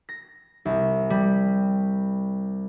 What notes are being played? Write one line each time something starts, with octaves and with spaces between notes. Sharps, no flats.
A#6
C2
G3